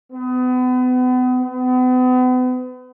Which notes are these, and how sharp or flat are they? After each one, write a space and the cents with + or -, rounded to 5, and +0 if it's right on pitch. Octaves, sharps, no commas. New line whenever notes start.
B3 +35
B3 +40